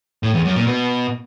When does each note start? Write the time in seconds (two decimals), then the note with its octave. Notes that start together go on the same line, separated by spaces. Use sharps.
0.23 A2
0.34 E2
0.45 F#2
0.56 A#2
0.67 B2